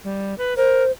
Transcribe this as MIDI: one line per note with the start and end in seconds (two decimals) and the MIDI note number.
0.04 0.35 55
0.38 0.54 71
0.57 0.83 70
0.57 0.91 72